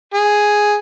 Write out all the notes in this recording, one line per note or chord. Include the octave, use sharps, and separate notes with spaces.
G#4